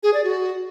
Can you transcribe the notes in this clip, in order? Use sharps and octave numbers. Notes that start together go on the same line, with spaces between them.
G#4
D5
F#4